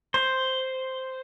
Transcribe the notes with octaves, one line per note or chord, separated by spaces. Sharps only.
C5